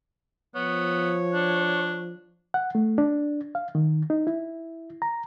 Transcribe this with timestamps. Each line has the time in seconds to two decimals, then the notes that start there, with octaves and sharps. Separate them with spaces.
0.55 F3 B3 C#5
1.34 D4
2.54 F#5
2.75 A3
2.98 D4
3.55 F5
3.75 D#3
4.10 D#4
4.27 E4
5.02 A#5